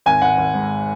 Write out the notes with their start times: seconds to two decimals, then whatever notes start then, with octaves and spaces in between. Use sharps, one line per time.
0.06 G#1 G#5
0.22 G#1 F#5
0.38 G#1
0.54 G#2